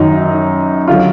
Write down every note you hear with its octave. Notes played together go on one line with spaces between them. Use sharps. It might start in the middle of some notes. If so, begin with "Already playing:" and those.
Already playing: F#2 D#3 F#3 D#4
D3 F#3 F4